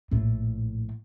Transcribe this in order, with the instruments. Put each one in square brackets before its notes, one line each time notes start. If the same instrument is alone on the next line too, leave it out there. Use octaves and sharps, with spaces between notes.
[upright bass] A#1 A2